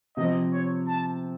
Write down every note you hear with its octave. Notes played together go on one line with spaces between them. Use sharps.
C3 F3 C4 D#5
C#5
A5